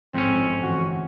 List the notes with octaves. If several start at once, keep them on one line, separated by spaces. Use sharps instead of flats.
A1 F2 G#2 G#3 C4 C#4
G1 E3 F#4